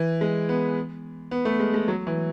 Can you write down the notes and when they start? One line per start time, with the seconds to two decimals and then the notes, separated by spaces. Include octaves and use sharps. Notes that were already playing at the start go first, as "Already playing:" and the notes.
Already playing: E3
0.21 G#3
0.49 B3
1.31 B3
1.45 A3
1.60 G#3
1.74 G#3
1.88 F#3
2.07 E3